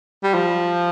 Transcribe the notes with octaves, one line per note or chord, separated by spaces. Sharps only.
G3
F3